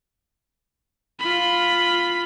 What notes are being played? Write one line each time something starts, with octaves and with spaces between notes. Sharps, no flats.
F4 B5